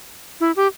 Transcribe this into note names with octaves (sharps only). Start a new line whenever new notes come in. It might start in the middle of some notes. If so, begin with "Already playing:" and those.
E4
G4